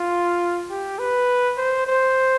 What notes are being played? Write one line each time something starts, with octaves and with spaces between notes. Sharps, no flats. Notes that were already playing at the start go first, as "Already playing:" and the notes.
Already playing: F4
G4
B4
C5
C5